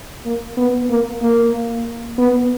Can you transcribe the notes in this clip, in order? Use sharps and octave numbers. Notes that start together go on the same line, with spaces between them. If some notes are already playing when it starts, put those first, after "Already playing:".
A#3
B3
A#3
A#3
B3